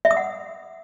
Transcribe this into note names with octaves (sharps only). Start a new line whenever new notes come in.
E5
D#6
F#5